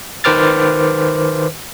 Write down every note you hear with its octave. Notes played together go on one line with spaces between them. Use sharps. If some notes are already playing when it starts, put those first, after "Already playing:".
D#3 B4 C5 D6 F6 A6